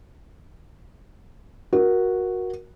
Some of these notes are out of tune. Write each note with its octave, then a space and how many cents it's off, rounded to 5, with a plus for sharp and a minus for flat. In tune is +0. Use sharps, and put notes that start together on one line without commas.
F#4 -5 A#4 +15